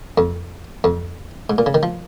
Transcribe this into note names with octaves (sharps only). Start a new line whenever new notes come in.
F2
F2
G#2
A#2
C#3
D#3
F3